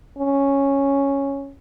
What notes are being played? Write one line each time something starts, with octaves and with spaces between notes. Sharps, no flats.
C#4